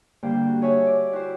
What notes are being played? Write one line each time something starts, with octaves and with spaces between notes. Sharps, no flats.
G2 D3 A#3 C5 G5
F#4
G#4 C#5 E5 G#5 A5
D5
E4 F#4 G4 C5